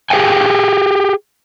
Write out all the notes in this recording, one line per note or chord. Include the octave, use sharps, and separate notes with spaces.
G4 G#4 C#5 F5 G5 G#5